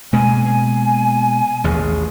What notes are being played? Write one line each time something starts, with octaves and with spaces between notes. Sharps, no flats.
B2 G#3 A#3 G#5
G#5
A1 D#2 F3 G#4